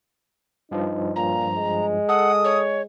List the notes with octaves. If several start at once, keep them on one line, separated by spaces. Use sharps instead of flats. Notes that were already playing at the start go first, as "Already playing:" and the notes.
G2 F3 D#4
A#2 A#5
G#3
A4 F#5 D#6
C#5